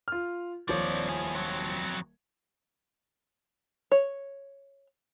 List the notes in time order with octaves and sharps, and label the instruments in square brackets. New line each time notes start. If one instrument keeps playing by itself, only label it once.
[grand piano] F4 F6
[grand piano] D#1 F3 C#5 [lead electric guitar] C4 D5
[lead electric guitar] E4 G#4
F2 F#3
[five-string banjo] C#5